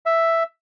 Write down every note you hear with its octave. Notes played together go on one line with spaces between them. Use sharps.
E5